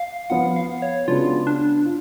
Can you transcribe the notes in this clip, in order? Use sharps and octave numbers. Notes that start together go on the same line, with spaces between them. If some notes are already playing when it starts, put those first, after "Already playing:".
Already playing: F5
F3 B3 F4 F#5
F5
C#5
C#3 G#3 B3 D4 F4 F#4
D4
F4